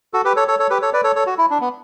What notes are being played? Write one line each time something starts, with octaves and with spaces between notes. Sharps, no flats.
F#4 A4
G4 B4
A4 C#5
A4 C#5
A4 C#5
G4 B4
A4 C#5
B4 D5
A4 C#5
A4 C#5
F#4
E4
D4
B3